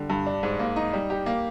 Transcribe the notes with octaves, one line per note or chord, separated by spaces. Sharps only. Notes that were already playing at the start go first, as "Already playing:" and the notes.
Already playing: D3 G3
G2
D4
G#2
A#3
D#4
G3
G4
A#3